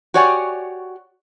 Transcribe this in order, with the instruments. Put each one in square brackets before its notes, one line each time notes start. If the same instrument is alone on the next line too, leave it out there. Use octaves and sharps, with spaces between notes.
[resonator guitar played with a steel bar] F#4 G4 C#5 D5 F#5 G#5